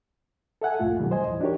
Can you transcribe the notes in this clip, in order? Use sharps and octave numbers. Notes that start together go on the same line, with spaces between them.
A4 E5 F#5 G#5
C2 F2 A2 A3 F4
B2 D#3 F#3 G3
C5 D#5 G#5
D#2 A2 E3
D4 D#4 F#4 G4 A#4 C#5